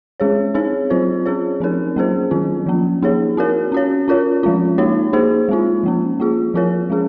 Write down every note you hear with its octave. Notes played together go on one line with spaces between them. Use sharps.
G#3 C#4 G#4 C#5
C4 D#4 G#4 C#5
F#3 C4 F4 C5
C#4 G#4 C#5
F3 C4 D#4 A#4
F#3 A#3 C#4 G#4 C5
D#3 F#3 C4 F4
F3 A#3 C#4
A#3 D#4 G#4 C#5
C4 F#4 A#4 C#5
C#4 F#4 C#5
C#4 F4 A#4 C#5
F3 G#3 C#4 F4
A#3 D#4 F#4 C#5
A#3 D#4 G#4 C5
G#3 C4 F4
F3 A#3 C#4
A#3 F4 G#4
F3 C4 F4 A#4 C#5
G#3 C#4 G#4